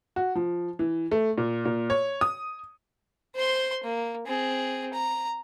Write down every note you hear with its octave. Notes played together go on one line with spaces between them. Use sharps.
F#4
F3
E3
A3
A#2
A#2
C#5
D#6
C5 C6
A#3
C4 G#4
A#5